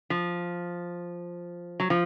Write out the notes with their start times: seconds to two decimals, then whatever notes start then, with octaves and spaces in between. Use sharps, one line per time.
0.10 F3
1.80 F#3
1.90 F3